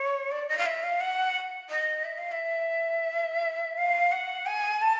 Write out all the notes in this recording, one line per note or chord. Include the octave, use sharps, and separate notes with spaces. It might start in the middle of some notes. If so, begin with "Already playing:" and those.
Already playing: C#5
D5
D#5
F5
E5
F5
F#5
D#5
E5
F5
E5
F5
F#5
G#5
A5